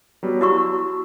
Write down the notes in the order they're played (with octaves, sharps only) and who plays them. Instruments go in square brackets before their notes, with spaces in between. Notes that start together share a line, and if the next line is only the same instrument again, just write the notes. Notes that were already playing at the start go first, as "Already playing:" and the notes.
[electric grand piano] F#3 G3 B3
[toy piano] E4 F#4 C#6 [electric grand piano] A5 E6